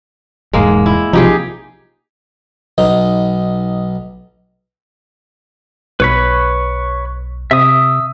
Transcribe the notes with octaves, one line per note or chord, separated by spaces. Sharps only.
E1 G#2 G#3 A#3
E4
B1 C3 F3 D#4 G4 G#4
B1 D#4
B1 B4 C#5 B5
C3 E5 D#6